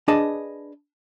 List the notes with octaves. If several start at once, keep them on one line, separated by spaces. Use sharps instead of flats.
D4 G#4 B4 D#5 A5